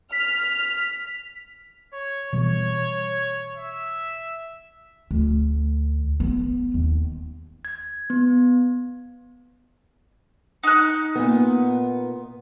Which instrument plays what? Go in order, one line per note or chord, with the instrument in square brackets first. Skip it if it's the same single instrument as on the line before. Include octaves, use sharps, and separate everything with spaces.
[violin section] F6 [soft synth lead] B6
[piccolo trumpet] C#5
[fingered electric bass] B2 E3 G3 [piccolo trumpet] C#5
[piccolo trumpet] E5
[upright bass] D2
B3
D#2
[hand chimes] G#6
B3
[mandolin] D#4 F#6
[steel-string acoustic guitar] A#2 B3